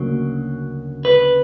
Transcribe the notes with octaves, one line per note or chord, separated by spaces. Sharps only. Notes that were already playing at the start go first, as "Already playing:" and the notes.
Already playing: D2 C#3 F#3 A#3
B4